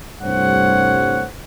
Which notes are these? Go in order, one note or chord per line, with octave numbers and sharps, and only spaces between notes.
C2 G2 A3 C5 C#5 F#5